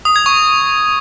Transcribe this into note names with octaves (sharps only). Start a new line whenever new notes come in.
D#6
G#6
C#6